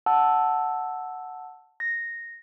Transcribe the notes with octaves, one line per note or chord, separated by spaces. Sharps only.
F#5 A5 E6
A#6